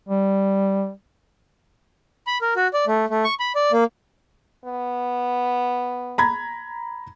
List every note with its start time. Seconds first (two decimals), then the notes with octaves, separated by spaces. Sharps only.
0.09 G3
2.27 B5
2.42 A#4
2.56 F#4
2.74 D5
2.87 A3
3.10 A3
3.24 C#6
3.40 B5
3.55 D5
3.72 A#3
4.65 B3
6.18 A#5 B5 G#6